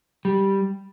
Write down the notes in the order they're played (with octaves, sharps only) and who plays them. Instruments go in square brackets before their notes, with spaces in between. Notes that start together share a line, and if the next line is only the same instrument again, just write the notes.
[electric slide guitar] G3